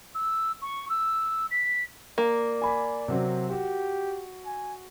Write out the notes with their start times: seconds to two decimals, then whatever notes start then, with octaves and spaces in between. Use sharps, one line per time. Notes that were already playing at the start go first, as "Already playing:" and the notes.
0.15 E6
0.62 C#6
0.89 E6
1.51 B6
2.18 A#3 D5
2.62 G#5 B5
3.08 C3 F#3 C4
3.50 F#4 G4
4.46 G#5